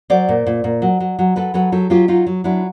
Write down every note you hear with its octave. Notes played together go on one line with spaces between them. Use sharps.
F#3 C5 D5
A#2
A#2
A#2
F#3
F#3
F#3
F#3 A4 B4
F#3 A4 B4
F#3 G4 A4
F#3 F4 G4
F#3 D#4 F4
F#3
F#3 D4 E4